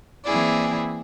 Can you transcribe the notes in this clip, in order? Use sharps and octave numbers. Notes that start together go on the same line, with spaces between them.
E3 A#3 C4 E4 G#4 D5